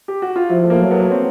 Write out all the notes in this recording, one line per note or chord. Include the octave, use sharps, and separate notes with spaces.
G4
F#4
F4
F3 E4
A3
A#3
F#3
B3
C4